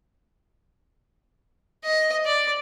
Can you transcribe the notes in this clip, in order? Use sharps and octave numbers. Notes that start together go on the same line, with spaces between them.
D#5
D5